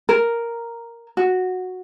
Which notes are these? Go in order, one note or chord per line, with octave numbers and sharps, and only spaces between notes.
A#4
F#4